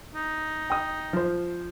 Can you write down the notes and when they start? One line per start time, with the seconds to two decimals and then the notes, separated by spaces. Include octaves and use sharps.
0.14 D#4
0.70 G5 D#6
1.13 F3 C5